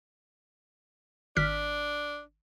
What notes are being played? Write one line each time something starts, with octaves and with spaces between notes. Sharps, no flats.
G#1 D4 F6 B6